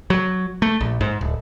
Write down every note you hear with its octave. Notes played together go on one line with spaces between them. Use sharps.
F#3
A3
A#1
G#2
D1